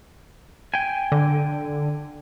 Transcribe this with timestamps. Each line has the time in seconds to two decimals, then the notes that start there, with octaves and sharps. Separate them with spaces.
0.74 G5 G#5
1.12 D3